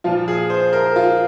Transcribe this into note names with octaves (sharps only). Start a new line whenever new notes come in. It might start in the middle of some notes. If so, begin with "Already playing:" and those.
A#2 F3 F4
G#4
C5
A#4
F4